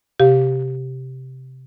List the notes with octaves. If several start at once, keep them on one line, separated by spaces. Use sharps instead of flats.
C3 G4 F5